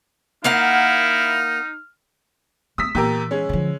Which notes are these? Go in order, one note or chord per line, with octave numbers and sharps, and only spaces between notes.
A#3 D#4 E4 F5 F#5 F6
A3 D#6 E6 B6
A#2 E3 G4 A#4
G#3 C#4
D3 F3